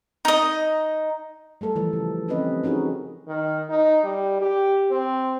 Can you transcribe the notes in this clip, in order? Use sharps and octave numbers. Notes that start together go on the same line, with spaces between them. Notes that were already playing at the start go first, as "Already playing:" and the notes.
D#4 D#5
G3 A3 A4 A#4
E3 F3 G3
C#3
C4 C#4 G4 B4 D#5
C#4 D#4 F#4 G#4 A#4
D#3
D#4
G3
G4
C4